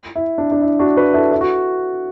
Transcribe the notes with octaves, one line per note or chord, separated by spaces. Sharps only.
E4
D4
D4
E4
D4 F#4
F#4 B4
E4 A4
E4 A4
F#4